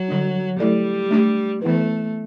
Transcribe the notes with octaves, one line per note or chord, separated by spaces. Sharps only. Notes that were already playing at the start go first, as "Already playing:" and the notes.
Already playing: F#3
D3 G3 D4
F#3 G3 A3 E4 A4 D5
A3 D4 G4
E3 A3 B3 E4 B4